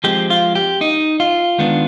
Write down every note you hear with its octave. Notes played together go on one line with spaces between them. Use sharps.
F3 G#3 C4 G4
F4
G4
D#4
F4
D#3 G#3 B3 D4